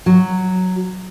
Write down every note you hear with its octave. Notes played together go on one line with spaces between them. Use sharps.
F#3